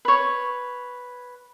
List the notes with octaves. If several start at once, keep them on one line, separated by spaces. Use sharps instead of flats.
B4 C#5